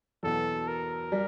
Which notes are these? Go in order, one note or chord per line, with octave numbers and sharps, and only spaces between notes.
E2 B2 F#3 B3 A4
A#4
G3